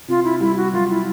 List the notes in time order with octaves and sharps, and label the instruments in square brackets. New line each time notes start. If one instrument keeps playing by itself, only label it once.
[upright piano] C3 [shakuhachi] F4
[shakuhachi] E4
[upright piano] G3 [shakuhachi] E4
[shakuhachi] F#4
[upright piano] F#3 [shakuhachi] F4
[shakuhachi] E4